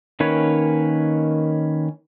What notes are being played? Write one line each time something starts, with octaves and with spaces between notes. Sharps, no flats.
D#3 A#3 C#4 B4 C#5